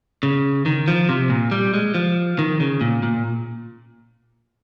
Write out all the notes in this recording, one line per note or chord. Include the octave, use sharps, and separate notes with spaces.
C#3
D#3
F3
C3
A#2
G3
G#3
F3
D#3
C#3
A#2
A#2